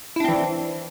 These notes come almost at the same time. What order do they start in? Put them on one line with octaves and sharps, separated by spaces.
E4 D4 C4 E3